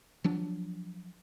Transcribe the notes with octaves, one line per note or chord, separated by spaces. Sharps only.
F3 F#3 D4